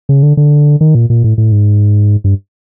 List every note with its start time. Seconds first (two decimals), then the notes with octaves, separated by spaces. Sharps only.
0.09 C#3
0.23 D3
0.37 D3
0.81 D#3
0.95 A#2
1.10 A#2
1.24 A2
1.38 A2
1.52 G#2
2.24 G2